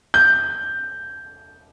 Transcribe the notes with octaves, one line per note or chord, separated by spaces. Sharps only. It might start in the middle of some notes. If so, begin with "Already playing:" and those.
G6